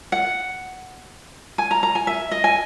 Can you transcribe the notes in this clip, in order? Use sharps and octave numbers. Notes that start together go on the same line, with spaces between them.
F#5
G#5
A#5
A#5
G#5
E5
D#5
G#5